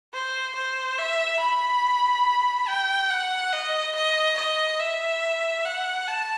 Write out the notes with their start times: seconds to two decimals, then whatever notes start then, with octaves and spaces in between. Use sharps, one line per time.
0.14 C5
0.55 C5
0.98 E5
1.40 B5
2.68 G5
3.10 F#5
3.53 D#5
3.96 D#5
4.38 D#5
4.79 E5
5.65 F#5
6.07 A5